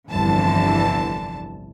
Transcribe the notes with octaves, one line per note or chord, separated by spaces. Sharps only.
G1 C2 F2 D3 E3 A5